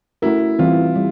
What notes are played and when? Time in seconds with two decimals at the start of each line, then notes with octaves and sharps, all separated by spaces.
0.22 A3 C#4 E4 F#4 A#4
0.59 E3 G3 C4 F4
0.96 G3